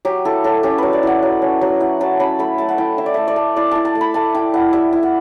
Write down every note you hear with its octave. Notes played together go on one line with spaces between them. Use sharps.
F#3 G4
E4 A4
F#3 A4
C#4 G4
F#3 B4
D5
E4 F#5
F#3
C#4
F#3
E4 F#5
F#3 A5
C#4 B5
A3 B5
A3 A5
F#5
E4 G5
E4 E5
D5
A3 E5
D5
A3
E4 D5
E4 A5
A5
A3
B5
A3 A5
E4 G5
E4 F#5
G3 E5
E4
F#5